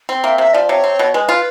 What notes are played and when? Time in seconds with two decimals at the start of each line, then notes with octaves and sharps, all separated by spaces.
0.09 C4
0.24 A#3 E5
0.38 C3 E5
0.53 F3 D5
0.69 C3 C#5
0.84 C4
0.99 B2
1.13 G#3 B4
1.29 F4